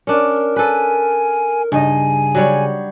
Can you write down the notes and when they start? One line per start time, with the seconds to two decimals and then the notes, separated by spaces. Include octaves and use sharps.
0.07 C#4 D4 A#4
0.56 A4 B4 G#5
1.72 G2 C#3 D#4 D#5 G#5
2.35 F#3 G3 C#5